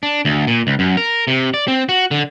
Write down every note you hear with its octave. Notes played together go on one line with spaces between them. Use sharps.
D4
D2
A#2
C#2
F#2
A#4
C3
D5
C4
F#4
D3